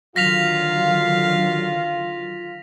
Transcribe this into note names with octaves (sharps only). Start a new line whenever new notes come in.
D3 D#3 F#3 F4 F5 A#6 B6 F7